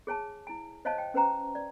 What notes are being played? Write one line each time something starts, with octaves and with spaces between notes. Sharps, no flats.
G#4 C#5 G#5 A5
E4 G#5
C5 C#5 D#5 F5 G#5 A5
G5
C#4 B4 C5 G5 A#5
D5